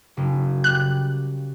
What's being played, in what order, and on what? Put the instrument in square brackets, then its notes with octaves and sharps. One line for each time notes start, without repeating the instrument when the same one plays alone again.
[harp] F#1
[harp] G3 [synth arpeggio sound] F#6